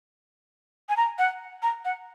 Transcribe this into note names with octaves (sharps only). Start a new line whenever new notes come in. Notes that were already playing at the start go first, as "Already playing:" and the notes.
G#5
A#5
F#5
A#5
F#5